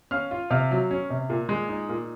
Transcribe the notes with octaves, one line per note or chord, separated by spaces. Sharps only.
C#4 F5 F6
F4
C3 F5 F6
F#3
C#4
C3
A#2
G#3
D#4
A#2